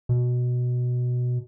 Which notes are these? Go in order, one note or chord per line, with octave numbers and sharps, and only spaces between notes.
B2